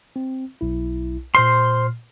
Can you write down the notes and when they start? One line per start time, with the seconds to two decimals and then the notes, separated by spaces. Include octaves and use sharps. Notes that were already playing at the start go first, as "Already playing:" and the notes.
0.16 C4
0.61 B1 E4
1.35 A#2 C5 C6 F6